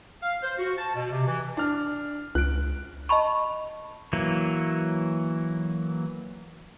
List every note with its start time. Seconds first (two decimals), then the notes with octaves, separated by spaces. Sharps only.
0.23 F5
0.43 C5
0.59 F#4
0.78 A5
0.95 B2
1.12 C3
1.28 E3
1.57 D4 F6
2.35 C#2 F#6 D7
3.09 D#5 A5 B5 C#6
4.13 E3 F#3 A#3